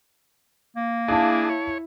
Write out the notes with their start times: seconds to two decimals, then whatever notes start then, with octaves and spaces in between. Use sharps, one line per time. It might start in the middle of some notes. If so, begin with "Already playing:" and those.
0.76 A#3
1.08 D4 E4 G#4 F5 A5
1.49 C#5